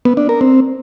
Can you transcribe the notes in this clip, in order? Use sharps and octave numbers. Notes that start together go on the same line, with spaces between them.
B3
D4
A#4
C4